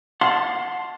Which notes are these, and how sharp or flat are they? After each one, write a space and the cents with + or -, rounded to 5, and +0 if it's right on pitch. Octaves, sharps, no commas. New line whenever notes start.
F#5 -25 A5 +0 C6 +0